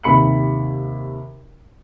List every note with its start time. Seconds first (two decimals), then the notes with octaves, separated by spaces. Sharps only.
0.03 D#2 C3 B5 C#7 F#7